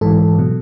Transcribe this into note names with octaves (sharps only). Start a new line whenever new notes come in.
G#2 E3 A4
B2 F#3